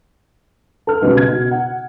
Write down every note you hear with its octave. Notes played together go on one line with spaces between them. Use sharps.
A4 F6
C#2 B2 G3 B3
C#3 G#6
B2
F#5